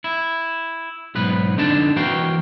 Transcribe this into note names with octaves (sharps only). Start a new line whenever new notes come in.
E4
B1 G#2 B3 B4
F2 D3 D4 D#4 A5
E3 A#3 F#4 F5 G5